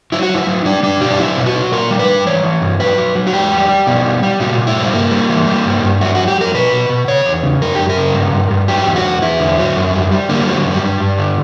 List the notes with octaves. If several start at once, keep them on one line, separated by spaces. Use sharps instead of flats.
F#3 E4
F#4
F#3
E4
F#3
G3 D4
G3 D4
B2 G4
D4
F#3 E4
B2
F#4
F#3
A#2 A#4
G3
B4
G3
E3 C#5
E3
G2
F#3 B4
F#3
F#3
F#4
E2 G4
G3
G3
B2
G3
G3
A#2 F#4
A#2
E4
F#3
G3
G2 A#3
G3
E3
G3
G2
G2
F#3 F#4
F#3 F#4
G4
F#3 A#4
B2 B4
B2
B2
C#3 C#5
E2
C#3
F#2 A#4
F#2 G4
A#4
C#3
G2
G2
G2
F#3 G4
E2
F#4
E2
E2 E4
D3
F#3
F#2
G3
G3
D3 A#3
G3
F#3
F#2
G3
G2
G2
D3